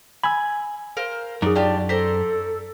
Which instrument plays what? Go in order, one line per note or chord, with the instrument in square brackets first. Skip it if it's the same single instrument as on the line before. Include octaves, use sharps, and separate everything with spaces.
[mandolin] G#5 [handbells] B5 E6
[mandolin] A#4 C5 F5
[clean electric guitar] F#2 [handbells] D#4 G#4 [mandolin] D5
[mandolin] D4 F4 G4 [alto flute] D5
[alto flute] A4 [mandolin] C5 D5 A#5 [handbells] B6